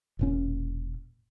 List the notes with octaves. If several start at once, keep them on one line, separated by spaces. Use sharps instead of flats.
E1 A#2 C#4